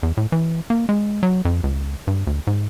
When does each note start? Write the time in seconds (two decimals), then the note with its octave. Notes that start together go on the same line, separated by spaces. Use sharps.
0.03 E2
0.17 A2
0.32 E3
0.70 A#3
0.89 G#3
1.23 F#3
1.45 F2
1.63 C#2
2.07 G2
2.27 D2
2.47 G#2